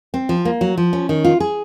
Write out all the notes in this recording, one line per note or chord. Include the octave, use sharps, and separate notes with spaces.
C4
F3
A#3
F#3
F3
C#4
D#3
F4
G#4